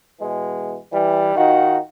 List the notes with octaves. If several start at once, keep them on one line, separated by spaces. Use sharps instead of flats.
B2 E3 G#3
E3 G3
D#3 D#4 F4 F#4